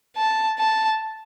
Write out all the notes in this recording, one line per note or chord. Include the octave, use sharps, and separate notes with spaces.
A5
A5